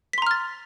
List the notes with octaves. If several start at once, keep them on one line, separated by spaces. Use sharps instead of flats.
A#5 C6 F6 A6 B6